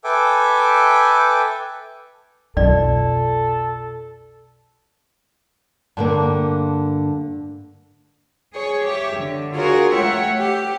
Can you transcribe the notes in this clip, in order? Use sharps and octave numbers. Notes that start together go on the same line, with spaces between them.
A4 B4 E5 G5 G#5 D6
B1 F2 B2 F4 A4 D5
G2 D3 A#3
G#4 C#5 C#6
G4 C#5 E5
D3
F4 F#4 G#4 A#4 C#5
A3 C#5 E5 F#5 G5
G4